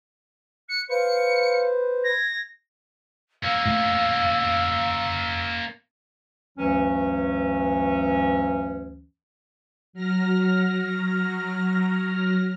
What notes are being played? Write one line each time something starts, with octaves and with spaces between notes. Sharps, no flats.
F#6 C#7
B4 C5 F5 C#7
G#6 A#6
A#3 C#4 F5 E6
A2
D2 G2 E3 F#3 C#4
F#3 F6 A#6